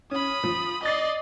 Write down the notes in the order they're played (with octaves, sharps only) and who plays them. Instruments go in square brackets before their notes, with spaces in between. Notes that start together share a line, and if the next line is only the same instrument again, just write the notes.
[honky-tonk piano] C#4 [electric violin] B5 D#6
[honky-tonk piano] F3
[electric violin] D5 D#5 [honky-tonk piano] D#6 A6 C7